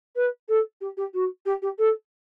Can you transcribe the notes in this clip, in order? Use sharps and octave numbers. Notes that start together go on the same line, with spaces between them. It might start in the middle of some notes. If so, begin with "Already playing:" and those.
B4
A4
G4
G4
F#4
G4
G4
A4